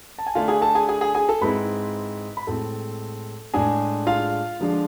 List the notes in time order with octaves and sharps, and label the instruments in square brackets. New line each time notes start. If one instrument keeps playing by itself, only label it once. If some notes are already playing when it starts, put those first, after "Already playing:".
[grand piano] A5
G#5
D3 A3 D4 F4 F5
G#4 G#5
A4 A5
G#4 G#5
G#4 G#5
G#4 G#5
G#4 G#5
A4 A5
G#2 G#3 C4 E4 B4 B5
B5
A2 G#3 C4 E4 A4 A5
A2 G#3 D4 G#4 G#5
F4 F5
D3 F3 G#3 D4